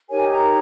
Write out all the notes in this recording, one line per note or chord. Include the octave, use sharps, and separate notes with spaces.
D#4 G4 A#4 C#5 G#5
A#5